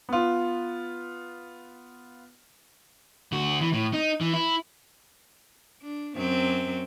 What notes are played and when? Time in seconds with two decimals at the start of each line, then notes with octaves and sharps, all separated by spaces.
0.09 B3 F4
3.32 D2 F#4
3.61 E3
3.73 A2
3.93 D#4
4.21 E3
4.34 E4
5.82 D4
6.15 F#2 F#3 C4